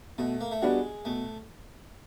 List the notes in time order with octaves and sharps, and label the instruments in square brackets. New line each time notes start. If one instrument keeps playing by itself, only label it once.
[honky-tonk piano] B2 [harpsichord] A3
[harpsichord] A#3
A3
[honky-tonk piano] G3 B3 D4 F#4 [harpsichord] G#3
[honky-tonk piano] B2 [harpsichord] A3